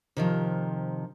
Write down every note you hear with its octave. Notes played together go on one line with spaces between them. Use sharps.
C3 D#3 F3